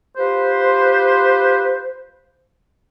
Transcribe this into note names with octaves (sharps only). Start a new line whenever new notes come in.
F4 G4 B4 C5